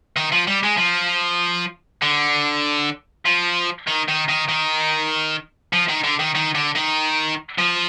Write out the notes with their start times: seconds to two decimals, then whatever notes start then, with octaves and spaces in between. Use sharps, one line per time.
0.16 D#3
0.32 F3
0.47 G3
0.63 G#3
0.78 F3
2.02 D3
3.25 F3
3.87 D#3
4.08 D#3
4.29 D#3
4.49 D#3
5.73 F3
5.88 D#3
6.04 D3
6.19 D#3
6.35 D#3
6.55 D3
6.76 D#3
7.58 F3